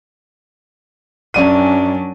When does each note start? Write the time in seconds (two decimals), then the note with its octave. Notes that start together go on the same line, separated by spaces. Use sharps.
1.34 F#2 F#3 C#4 D4 D5 D#7